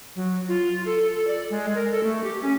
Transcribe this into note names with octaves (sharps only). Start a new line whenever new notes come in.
F#3
F4
A4
A4
D5
G#3
A#4
A4
A3
G4
C#4